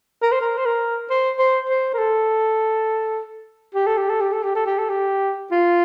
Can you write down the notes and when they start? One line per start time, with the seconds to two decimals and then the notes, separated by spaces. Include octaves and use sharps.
0.22 A#4
0.32 C5
0.41 A#4
0.57 C5
0.66 A#4
1.10 C5
1.39 C5
1.69 C5
1.94 A#4
1.98 A4
3.75 G4
3.87 A4
3.97 G4
4.09 A4
4.21 G4
4.33 A4
4.43 G4
4.55 A4
4.66 G4
4.78 A4
4.90 G4
5.52 F4